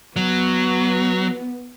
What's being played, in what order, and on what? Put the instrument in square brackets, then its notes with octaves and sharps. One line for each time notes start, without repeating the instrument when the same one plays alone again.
[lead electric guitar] F#3 [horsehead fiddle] B3